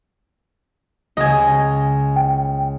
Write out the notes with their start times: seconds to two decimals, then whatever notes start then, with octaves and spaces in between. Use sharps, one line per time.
1.17 C#2 D#5 G#5
2.16 G5